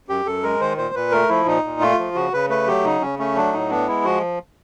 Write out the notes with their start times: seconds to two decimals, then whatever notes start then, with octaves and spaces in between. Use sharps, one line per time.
0.08 F#2 G4
0.26 F#2 A4
0.43 G#3 A#4
0.61 D#3 C5
0.77 A#2 C5
0.95 A#2 B4
1.12 A3 A#4
1.29 F3 E4
1.46 A#2 D#4
1.64 A#2
1.81 A3 F4
1.99 F3
2.15 C#3 F#4
2.33 C#3 B4
2.50 A3 B4
2.67 F#3 G4
2.84 C#3 D#4
3.01 C#3 C#4
3.19 A3 C#4
3.36 F#3 D4
3.53 A2 D#4
3.70 B3 D4
3.88 G#3 E4
4.05 F3 F#4